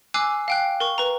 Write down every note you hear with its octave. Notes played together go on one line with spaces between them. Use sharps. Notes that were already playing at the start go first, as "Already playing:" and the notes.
G#5 D6 E6 F#6 C7
F5 G5 F#6
A#4 C#6
B4 A#5